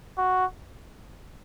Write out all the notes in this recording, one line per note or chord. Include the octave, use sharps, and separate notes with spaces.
F#4